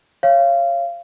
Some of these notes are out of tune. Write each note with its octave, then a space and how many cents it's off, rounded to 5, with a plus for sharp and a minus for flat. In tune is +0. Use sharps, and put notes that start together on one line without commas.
C#5 -10 F5 -25